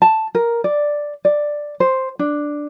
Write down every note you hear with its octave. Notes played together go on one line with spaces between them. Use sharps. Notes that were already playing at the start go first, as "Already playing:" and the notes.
A5
A#4
D5
D5
C5
D4